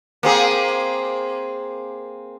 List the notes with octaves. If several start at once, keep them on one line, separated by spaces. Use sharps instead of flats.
A#3 C4 G#4